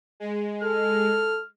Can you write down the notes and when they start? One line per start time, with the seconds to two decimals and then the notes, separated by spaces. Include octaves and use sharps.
0.20 G#3
0.63 A4 F6